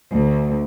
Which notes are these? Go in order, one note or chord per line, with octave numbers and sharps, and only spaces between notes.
D2